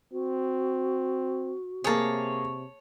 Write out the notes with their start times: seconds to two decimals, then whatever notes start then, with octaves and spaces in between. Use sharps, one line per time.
0.12 C4 F#4
1.84 C3 A#3 G#4 C#5 A5